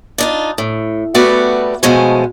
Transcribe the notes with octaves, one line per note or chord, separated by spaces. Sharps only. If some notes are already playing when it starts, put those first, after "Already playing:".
D4 D#4 F4
A2
G3 A3 B3 F#4 B4 D5
B2 F3 G#3 A3 C#4 C5